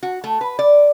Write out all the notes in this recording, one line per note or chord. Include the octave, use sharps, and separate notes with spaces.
F#4
A3
B4
D5